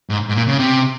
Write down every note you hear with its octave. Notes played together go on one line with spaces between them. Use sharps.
G#2
G#2
A#2
C#3
C3